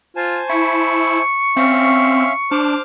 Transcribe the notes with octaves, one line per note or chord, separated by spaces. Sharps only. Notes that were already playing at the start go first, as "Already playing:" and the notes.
F4 C5 G#5 A5
E4 C#6
C4 C#4 E5 F5
D4 C5 D6 F6